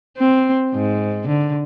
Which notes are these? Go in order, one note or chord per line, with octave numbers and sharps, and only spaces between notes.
C4
G#2
D3